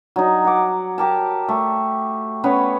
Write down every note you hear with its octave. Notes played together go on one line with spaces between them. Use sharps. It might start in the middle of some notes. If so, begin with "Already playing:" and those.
F#3 D#4
F#5 D6
G4 A#4 A5
A3
B3 C#4 B4 C#5